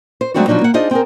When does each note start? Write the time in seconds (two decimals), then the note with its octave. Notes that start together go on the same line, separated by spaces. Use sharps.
0.21 C5
0.34 F#3 G#3 A3 C4 D4 F#4
0.48 B2 F3 F#3 D4 D#4
0.61 A#3 F#5
0.74 D4 D#4 F4 G#4 C5 D#5
0.91 C4 G#4 A#4